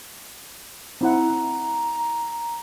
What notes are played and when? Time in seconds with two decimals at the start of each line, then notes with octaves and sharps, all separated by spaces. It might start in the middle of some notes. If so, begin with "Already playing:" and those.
1.01 C4 E4 F#5 A#5